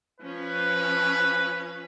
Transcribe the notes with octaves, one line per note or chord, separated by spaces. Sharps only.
F3 C#4 B4